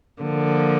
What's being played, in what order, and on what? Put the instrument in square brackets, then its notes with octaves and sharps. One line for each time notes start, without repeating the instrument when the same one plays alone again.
[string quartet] D3 F3 A#3